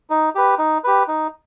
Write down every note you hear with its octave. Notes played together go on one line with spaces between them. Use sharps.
D#4
G4 B4
D#4
G4 B4
D#4